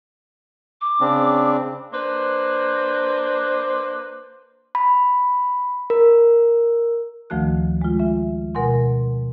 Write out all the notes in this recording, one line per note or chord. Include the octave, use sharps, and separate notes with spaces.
D6
C#3 C4 D4
A#3 D4 B4 C5
B5
A#4
D2 D#3 F3 A3 F#4 F#6
G#3 F4
E5
B2 A#4 F#5 G#5 C6